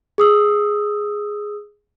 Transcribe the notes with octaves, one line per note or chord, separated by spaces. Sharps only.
G#4 D#6 E6